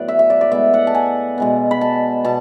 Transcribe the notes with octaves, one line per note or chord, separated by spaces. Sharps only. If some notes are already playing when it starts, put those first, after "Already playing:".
Already playing: A2 F#3 B3 B4 D5
E5
E5
D5
D5
A2 G#3 B3 E5
F#5
A5
G#5
B2 G#3 B3
B5
A5
B2 A5